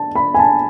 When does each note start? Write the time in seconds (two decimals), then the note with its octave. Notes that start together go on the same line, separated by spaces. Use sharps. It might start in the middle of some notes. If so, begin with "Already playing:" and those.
Already playing: A5
0.15 B5
0.34 G#5
0.39 A5